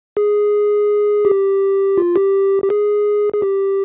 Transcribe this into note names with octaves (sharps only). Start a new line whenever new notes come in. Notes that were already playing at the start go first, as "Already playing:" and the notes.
G#4
G4
F4
G4
G4
G#4
G#4
G4